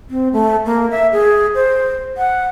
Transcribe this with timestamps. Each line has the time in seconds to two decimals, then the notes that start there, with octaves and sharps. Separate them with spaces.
0.10 C4
0.33 A3
0.66 A#3
0.91 E5
1.12 G#4
1.55 C5
2.17 F#5